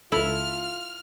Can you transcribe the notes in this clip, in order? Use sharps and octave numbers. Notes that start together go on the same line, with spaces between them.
C#2 E4 F4 A4 F6